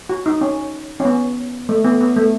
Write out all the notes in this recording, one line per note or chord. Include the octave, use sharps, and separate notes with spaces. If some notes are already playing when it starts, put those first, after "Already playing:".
F#4
D#4
C#4
C#4
B3
A3
B3
B3
A3